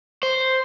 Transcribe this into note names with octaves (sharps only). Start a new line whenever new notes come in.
C5